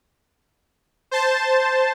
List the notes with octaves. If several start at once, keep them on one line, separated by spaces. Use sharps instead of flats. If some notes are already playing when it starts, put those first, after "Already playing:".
C5 A5